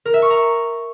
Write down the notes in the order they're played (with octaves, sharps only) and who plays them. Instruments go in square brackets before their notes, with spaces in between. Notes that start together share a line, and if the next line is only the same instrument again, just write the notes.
[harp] A#4
E5
C#6
A#5